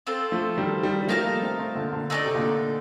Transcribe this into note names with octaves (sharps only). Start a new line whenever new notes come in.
C4 F4 A4 C5
F3 A3
D#3 G3
D#3 G3
G3
F3 A3 D#4 A#4 F5 A5
G3 A#3
A3 C4
A3 C4
A#2 D3
A#2 D3
A3 D#4 A4 D5
C3
A#2 D3